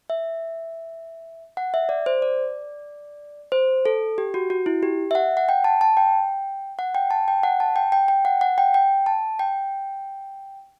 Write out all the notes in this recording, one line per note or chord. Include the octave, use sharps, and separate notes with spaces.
E5
F#5
E5
D5
C5
D5
C5
A4
G4
F#4
F#4
E4
G4
E5
F#5
F#5
G5
A5
A5
G5
F#5
G5
A5
G5
F#5
A5
G5
G5
G5
F#5
F#5
G5
G5
A5
G5